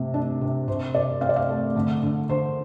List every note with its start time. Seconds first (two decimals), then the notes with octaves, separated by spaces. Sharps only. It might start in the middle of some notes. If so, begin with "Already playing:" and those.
Already playing: C3 A3
0.14 D4
0.41 C3
0.68 C3 C5
0.95 C3 D5
1.21 C4 F5
1.29 D5
1.36 F5
1.49 A3
1.76 D3
2.03 D3
2.29 D3 C5